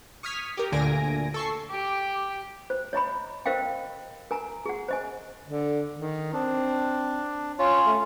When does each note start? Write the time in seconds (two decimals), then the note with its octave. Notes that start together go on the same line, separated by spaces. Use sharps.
0.23 C#6 D#6 F6 G#6 B6
0.57 G4 A#4
0.72 D2 A#2 D3 G#5 A#6 D7
1.34 A4 C#6 C7
1.70 G4 D6
2.70 C5
2.93 C#5 D#5 A#5 B5
3.46 A#4 C5 D#5 F5 G5
4.31 A#4 G#5 A#5
4.66 G#4 F#5
4.88 C5 D#5 G#5
5.45 D3
5.99 D#3
6.34 C4 D4
7.59 C#4 F4 C#5
7.86 A3